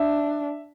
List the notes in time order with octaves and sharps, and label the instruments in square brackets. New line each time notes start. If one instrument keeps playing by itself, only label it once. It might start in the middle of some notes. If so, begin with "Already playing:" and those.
Already playing: [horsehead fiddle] D4 [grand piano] E5